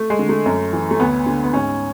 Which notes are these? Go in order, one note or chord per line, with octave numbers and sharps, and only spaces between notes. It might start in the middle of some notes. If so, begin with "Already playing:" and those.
Already playing: A3
G#3
D3
A3
F#2
E3
A3
D2 B3
D3
B3
G#2 C#4